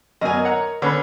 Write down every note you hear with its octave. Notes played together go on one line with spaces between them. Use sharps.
F#2 B2 A#4 D#5 G#5
C#5 F#5 A#5
D3 C#4 B4 C#5